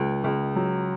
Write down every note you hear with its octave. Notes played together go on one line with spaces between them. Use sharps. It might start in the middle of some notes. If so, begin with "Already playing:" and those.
Already playing: C#2
C#2
F#3